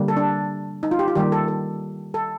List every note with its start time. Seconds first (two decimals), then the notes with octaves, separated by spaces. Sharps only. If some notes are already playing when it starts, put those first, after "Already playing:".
Already playing: D3 G3 A#3
0.08 A4
0.17 D4
0.83 D#4
0.91 F4
0.99 G4
1.08 F4
1.15 D#3 G3 A#3 G4
1.32 A4
1.48 A4
2.14 A4